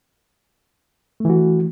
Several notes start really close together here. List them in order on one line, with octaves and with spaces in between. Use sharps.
A3 E3 F#4